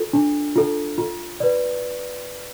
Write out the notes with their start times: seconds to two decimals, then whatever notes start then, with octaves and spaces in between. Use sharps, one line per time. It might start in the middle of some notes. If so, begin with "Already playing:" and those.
Already playing: F4 A4
0.13 D4
0.56 F4 A4
0.98 F4
1.40 B4 D5